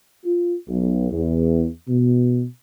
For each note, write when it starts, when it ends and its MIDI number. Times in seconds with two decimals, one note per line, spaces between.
0.24 0.54 65
0.68 1.08 35
1.12 1.67 40
1.88 2.44 47